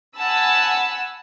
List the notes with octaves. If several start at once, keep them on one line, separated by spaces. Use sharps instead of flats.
F#5 G#5 A5 B5 E6